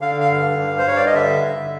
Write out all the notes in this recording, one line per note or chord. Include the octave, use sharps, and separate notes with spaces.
D3 F5
F5
G2
G2
C5
G2 C#5
D5
D#5
D3 E5
D3